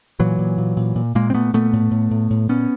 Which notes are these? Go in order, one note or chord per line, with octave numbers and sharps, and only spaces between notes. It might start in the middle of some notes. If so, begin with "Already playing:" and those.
A#2 E3 F#3
A#2
A#2
A#2
A#2
A#2 G#3 A#3
C4
A#2 A3 B3
A#2 A3 B3
A2
A2
A2
A2
A#2 B3 C#4